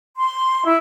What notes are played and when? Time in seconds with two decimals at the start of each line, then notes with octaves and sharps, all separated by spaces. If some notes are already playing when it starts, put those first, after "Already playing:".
0.17 C6
0.65 E4